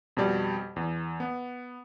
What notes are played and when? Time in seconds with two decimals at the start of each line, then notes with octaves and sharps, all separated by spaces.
0.17 F2 B2 G3 D5
0.76 E2
1.20 B3